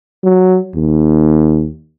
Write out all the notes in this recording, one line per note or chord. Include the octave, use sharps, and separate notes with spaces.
F#3
D#2